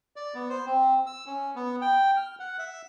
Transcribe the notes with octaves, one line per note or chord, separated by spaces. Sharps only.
D5
B3
C5
C4
E6
C#4
B3
G5
F6
F#5
E5